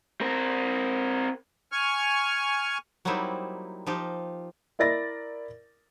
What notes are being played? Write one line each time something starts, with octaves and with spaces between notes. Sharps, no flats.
C4 A#4
G#5 C#6 F6
F#3 G3 A#3 C4 D#4 E4
F3 D#4 F4 G4
E4 A#4 D5 A6 A#6